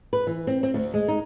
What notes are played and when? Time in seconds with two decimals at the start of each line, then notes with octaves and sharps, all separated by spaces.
0.13 B4
0.27 E3
0.47 C4
0.63 C4
0.74 D2
0.94 G#3
1.08 D#4